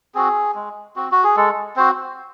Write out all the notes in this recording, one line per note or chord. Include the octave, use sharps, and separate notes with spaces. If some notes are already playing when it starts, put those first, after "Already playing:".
C4 F#4 G#4
G#3
C4 F#4
F#4
G#4
G#3 A4
C4 F#4 C5